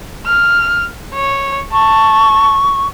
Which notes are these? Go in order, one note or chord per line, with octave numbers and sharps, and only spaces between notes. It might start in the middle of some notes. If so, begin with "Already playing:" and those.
F6
C#5
A5 C#6